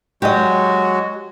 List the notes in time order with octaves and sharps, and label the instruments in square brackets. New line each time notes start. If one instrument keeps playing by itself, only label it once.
[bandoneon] F#3 G#3 F#4 [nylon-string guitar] G4 D#5